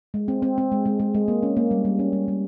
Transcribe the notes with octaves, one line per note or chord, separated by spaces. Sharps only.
G#3
C4
C4
C4
G#3
G#3
G#3
G#3
A#3
C#4
A#3
G3
G3
C#4
G3
G3